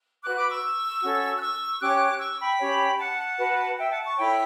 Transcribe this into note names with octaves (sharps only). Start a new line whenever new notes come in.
F#4 B4 D6 F#6
B5 D6
C#6 E6
C#4 F#4 A4
F#6
C#6 E6
C#4 G4 C#5 D6 F#6
C#6 E6
G5 B5
C#4 G4 C#5
F#5 A5
F#4 B4
E5 G5
F#5 A5
A5 C#6
E4 A4 C#5 G5 B5